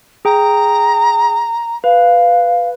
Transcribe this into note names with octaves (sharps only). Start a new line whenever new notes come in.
G#4 G5 A#5
B4 F5